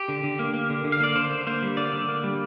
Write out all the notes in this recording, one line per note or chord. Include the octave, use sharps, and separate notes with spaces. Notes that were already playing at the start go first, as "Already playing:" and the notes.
Already playing: G4
D3
D3
A#3
A#3
D3
D3
F5
A#3 D5
D3 C5
D3
A#3 C5
G3
D3 D5
D3
A#3
G3